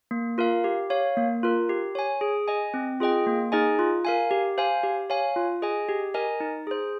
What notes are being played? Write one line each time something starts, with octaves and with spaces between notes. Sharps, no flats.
A#3
F4 A#4 F5
G4
C#5 F5
A#3
F4 A#4
G4
C#5 G#5
G#4
D#5 G#5
C4
F4 G#4 D#5 G5
A#3
D#4 G#4 D#5 G#5
F4
A#4 F5 G#5
G4
C5 F5 G#5
G4
C#5 F5 G#5
F4
G#4 D#5 G#5
G4
A#4 D#5 G#5
D#4
G#4 C5